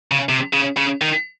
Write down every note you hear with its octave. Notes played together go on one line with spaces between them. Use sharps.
C#3
C3
C#3
C#3
D#3